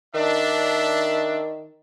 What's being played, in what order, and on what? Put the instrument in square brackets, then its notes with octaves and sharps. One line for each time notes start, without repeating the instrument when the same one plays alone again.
[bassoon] D#3 [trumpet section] D4 E5